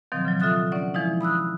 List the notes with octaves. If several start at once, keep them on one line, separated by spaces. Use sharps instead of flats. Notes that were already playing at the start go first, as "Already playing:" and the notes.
B2 D#3 F3 F#3 C4
C#3 F3 F#3
F4 A4 E5 D#6 F#6 A6
C#4 D5 F#5
E3 F3 G#3 D#4 E4
B5 D#6 E6 F#6